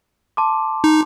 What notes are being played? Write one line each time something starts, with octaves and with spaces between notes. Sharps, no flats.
A5 C6 D6
D#4